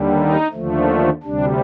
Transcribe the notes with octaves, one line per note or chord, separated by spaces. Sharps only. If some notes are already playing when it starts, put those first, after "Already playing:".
Already playing: D#2 D3 G3
D#4
D#2 D3 F3 A3
D2 C3 G3 D4